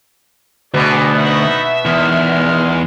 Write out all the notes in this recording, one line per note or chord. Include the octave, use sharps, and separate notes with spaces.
D2 B2 G#4 D5
B3 D#4 E5 F#5
E2 D#3 G#3 F6